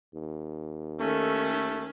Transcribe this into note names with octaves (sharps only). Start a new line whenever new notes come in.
D#2
D#3 A3 C#4 A4